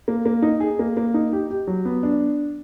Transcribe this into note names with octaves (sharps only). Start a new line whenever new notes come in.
A#3
A#3
D#4
G#4
A#3
A#3
D#4
G4
G4
F#3
B3
D4